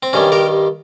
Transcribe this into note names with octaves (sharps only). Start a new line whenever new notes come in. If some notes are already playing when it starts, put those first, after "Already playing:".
C4
G2 D#3 G3 C#4
G4 A#4